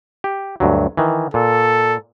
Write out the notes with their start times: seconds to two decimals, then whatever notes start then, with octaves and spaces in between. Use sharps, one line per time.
0.24 G4
0.60 D2 G2 F#3
0.97 D#3 E3
1.34 A#2 A4